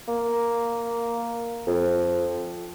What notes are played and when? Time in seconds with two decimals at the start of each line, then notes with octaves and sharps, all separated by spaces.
0.08 A#3
1.67 F2